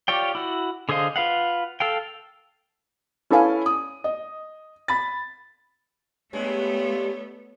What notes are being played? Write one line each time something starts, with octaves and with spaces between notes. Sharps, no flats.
F4 G4 C#5 D5 G5
E4 F#4
D3 G#4 C5 D#5 F5
F4 B4 F5 F#5
A4 F5 G5
C#4 E4 A4 B4 F5 G#5
D#6
D#5
B5 A6
G2 G#3 A3 B3 C#5